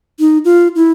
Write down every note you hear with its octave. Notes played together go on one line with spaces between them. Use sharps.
D#4
F4
E4